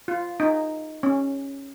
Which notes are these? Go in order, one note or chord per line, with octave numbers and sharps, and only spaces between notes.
F4
D#4
C#4